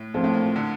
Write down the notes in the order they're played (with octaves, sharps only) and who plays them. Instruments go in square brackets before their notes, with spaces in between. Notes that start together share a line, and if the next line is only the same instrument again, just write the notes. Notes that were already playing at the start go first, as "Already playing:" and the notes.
Already playing: [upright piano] A2
[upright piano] A#2 [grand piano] F3 A3 C4
[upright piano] A2
A#2
D3